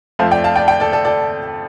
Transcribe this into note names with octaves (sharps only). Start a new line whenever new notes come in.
F2 F3 A3 C5 F5
D5 G5
F5 A5
D5 G5
D5 G5
A4 D5
A4 D5
A4 D5